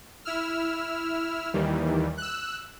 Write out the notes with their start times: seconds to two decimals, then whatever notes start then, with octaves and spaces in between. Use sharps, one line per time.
0.25 E4 E6 F6
1.53 D#2 D#3 E3 G3
2.17 E6 F#6